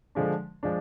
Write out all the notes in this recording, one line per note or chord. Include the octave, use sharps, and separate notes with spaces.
D3 F3 G#3 D4
F3 G#3 D4